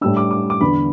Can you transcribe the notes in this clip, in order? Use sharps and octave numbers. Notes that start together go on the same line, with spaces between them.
A2 G3 D4 E6
D6
D6
D6
E2 D3 B3 D4 B5